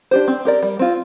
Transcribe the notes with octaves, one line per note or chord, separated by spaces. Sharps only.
D4 G4 C5
C4
G4 A#4 D5
G3
C4 F4